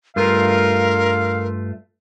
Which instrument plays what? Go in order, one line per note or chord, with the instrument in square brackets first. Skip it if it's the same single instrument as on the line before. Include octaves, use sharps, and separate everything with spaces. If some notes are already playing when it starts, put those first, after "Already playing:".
[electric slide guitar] G2 A3 F4 [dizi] A#4 [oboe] F5